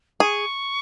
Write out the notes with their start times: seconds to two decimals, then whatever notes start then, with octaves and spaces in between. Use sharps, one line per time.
0.20 G#4 C#6